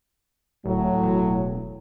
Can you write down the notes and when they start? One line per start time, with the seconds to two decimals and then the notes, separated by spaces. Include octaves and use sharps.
0.66 D1 A2 F#3
1.03 E1